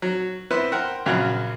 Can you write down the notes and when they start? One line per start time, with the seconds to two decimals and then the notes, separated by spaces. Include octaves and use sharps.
0.02 F#3
0.50 B3 C4 E4 B4 C5
0.72 A#4 C5 F#5 G5
1.06 A#1 C#3 F#3 F4 F#5